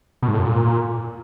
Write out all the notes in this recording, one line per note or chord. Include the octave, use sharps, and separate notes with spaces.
B2
G#2
A2
F#2
A#2